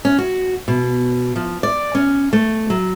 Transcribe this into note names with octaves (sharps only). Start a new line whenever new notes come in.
C#4
F#4
B2
F3
D5
C#4
A3
F#3